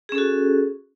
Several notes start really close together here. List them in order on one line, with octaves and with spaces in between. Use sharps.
G#4 C#4 A4 F#4